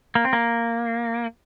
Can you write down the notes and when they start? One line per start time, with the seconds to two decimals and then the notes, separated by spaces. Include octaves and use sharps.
0.15 A#3
0.25 C4
0.33 A#3